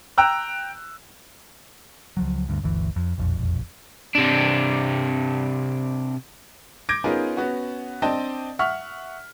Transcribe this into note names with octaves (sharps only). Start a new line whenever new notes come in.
G5 A#5 E6 F#6
C#2 F3 F#3
D2 G2
G1 D2 E3
F2
E1 A#1 F2
C3 D4
D6 G6 G#6 A#6 D7
B3 C#4 D#4 F4 G#4 A#4
B3 C#4 F#4
C4 D4 D5 D#5 G5 A5
E5 F#5 C#6 F6 B6